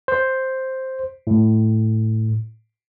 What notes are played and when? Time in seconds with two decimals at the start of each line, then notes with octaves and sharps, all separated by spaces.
0.08 C5
1.27 A2